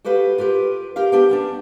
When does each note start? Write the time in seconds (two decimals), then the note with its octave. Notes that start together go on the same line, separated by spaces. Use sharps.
0.05 F#4 G4 A4 B4 F5
0.38 F4 G4 A#4 B4
0.96 G4 A#4 F5
1.12 B3 D4 G4 B4 G5
1.29 B3 C#4 D4